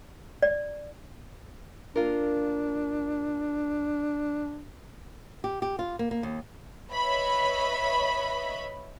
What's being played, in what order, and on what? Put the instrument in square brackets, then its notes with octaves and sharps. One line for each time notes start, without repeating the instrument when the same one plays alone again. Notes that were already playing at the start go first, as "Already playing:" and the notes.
[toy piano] D5
[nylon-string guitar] A#3 F4 A#4 [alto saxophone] D4
[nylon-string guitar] G4
G4
F4
A#3
A#3
D#2
[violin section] B4 C#5 D#5 E5 B5